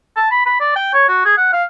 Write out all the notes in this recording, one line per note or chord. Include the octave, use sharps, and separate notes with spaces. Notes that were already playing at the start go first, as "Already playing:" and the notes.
A5
B5
B5
D5
G5
C#5
F#4
G#4
F#5
F5